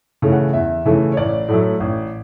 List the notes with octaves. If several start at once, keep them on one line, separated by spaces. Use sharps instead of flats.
C#3 E3 A3
F#5
E2 E5
C#3 E3 A3
C#5
A1 D5
A2 F#3 A3
A1